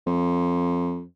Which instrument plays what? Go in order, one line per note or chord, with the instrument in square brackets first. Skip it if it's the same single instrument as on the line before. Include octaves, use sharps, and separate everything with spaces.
[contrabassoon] F2